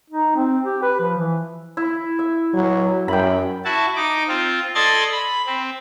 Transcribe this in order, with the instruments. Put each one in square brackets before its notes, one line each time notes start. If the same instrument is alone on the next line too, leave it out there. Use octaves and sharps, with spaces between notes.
[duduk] D#4
C4
G4
B4
F3
E3
[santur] E4
E5
[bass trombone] F#3
[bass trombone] F#2 [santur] G5 B5
[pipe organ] E4 F#4 A5
D#4 D6
C4 F4
A4 D5 D#5 C6 G#6 A6
B5
C4